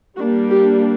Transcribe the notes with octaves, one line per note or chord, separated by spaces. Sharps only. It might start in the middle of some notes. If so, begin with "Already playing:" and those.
G3 A#3 D4 F#4
G4